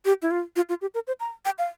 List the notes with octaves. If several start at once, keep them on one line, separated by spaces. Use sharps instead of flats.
G4
E4
F4
F4
F4
G4
A#4
C5
A#5
G5
F5